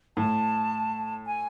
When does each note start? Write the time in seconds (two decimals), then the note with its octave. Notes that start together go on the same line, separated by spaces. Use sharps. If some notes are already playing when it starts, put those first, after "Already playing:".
0.17 A2 A5
1.26 G#5